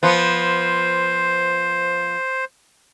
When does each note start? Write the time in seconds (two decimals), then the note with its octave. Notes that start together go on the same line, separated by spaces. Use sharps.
0.03 F3 B3 C5